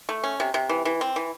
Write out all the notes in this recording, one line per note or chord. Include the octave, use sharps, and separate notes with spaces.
A3
C#4
C3
C3
E3
E3
C4
E3